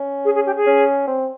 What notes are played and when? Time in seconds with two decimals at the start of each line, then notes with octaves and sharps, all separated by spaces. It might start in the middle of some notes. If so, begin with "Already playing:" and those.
Already playing: C#4
0.25 G#4
0.35 G#4
0.46 G4
0.56 G#4
0.67 C#4
1.07 C4